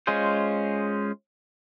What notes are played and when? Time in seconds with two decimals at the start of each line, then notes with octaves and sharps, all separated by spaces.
0.07 G#3 C#4 F4 G#4 C5